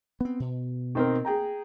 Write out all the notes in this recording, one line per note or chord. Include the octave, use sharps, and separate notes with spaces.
B3 C4
B2
D#3 C4 A#4
G#4 G5 A#5